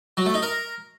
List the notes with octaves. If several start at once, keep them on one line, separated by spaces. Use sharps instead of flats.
F#3
A3
D#4
A#4